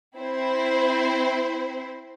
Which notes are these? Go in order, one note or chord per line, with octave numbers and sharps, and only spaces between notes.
C4 E4 C5